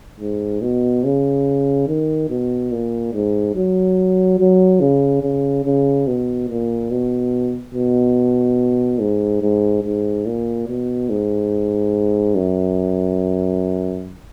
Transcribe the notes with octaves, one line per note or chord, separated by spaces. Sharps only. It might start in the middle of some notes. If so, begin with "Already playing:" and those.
G#2
B2
C#3
D#3
B2
A#2
G#2
F#3
F#3
C#3
C#3
C#3
B2
A#2
B2
B2
G#2
G#2
G#2
A#2
B2
G#2
F#2